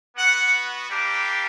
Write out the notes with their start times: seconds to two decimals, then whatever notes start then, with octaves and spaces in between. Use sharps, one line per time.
0.17 B3 F#4 F#5
0.90 G3 A#3 D4 G4